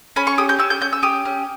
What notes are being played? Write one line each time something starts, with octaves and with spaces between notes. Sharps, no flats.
C#4 B5
C#6
G4 D#6
G6
C#4 E6
G6
C#4 G6
E6
G4 D#6
C#4